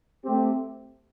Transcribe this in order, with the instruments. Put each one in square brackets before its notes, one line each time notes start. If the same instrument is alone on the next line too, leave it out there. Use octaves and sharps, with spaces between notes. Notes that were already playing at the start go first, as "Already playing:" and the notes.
[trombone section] A3 C4 G4